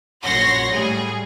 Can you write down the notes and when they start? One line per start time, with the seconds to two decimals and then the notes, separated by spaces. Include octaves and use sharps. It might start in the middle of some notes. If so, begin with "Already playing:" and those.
0.22 A#1 F#2 C#5 F#5 C6 A#6
0.71 A2 G3 G#4